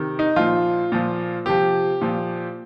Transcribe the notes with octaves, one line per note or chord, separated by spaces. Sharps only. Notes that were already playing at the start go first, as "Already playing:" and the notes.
Already playing: C3 D#3
D#4
A#2 F3 F4
A#2 F3
C3 F3 G4
A#2 F3